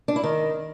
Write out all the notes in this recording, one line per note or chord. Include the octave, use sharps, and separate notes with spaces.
D4
E4
D#3